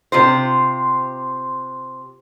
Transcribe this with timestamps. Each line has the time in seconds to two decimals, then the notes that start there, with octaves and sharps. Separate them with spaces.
0.12 C3 F4 C5